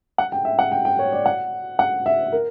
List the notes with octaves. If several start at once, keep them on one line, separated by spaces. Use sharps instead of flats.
F#5
G5
E5
F#5
G5
G5
C#5
D5
F#5
F#5
E5
A#4